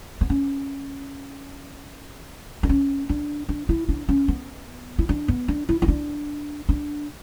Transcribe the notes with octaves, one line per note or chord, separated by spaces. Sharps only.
B3
C#4
D4
C#4
D4
D4
E4
D4
C#4
B3
E4
D4
B3
D4
E4
E4
D4
D4